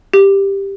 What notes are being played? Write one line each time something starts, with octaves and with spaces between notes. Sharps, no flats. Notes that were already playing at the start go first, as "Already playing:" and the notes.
G4